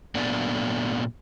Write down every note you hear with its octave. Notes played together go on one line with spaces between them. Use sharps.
A#2 F#3 A3 B3 D4 D5